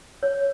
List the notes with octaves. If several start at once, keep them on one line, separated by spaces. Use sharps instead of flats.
C#5